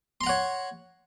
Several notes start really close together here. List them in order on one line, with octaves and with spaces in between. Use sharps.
C6 A#5 F#5 C#5